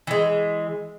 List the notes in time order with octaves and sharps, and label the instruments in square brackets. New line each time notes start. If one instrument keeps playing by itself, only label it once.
[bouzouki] E3 G#3